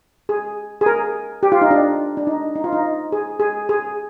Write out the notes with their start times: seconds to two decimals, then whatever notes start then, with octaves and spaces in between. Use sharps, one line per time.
0.29 G#4
0.81 G#4
0.86 A#4
1.43 G4
1.52 F4
1.61 D#4
1.71 D4
2.17 D4
2.27 D#4
2.56 D#4
2.64 F4
2.73 D#4
3.12 G#4
3.40 G#4
3.69 G#4